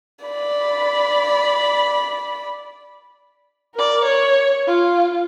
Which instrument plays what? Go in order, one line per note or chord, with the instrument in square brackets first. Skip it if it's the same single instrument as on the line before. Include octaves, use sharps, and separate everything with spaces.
[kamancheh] D5 B5
A#4 D5
C#5
F4